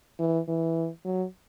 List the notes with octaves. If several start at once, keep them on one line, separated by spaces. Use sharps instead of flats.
E3
E3
F#3